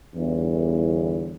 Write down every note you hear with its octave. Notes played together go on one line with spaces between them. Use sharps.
G1 E2